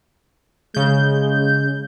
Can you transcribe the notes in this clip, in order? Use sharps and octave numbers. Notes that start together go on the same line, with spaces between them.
C#3 G#3 G6